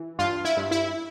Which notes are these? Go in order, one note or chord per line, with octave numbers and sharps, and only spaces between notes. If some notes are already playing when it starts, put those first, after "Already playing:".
Already playing: E3
G2 F4
E4
G2
E4